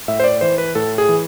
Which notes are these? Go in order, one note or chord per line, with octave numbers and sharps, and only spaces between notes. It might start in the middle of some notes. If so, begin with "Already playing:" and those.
A2 E5
C5
D5
E3 C5
B4
A2 A4
G#4
E3